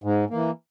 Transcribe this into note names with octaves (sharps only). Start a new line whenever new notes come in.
G#2
E3 A#3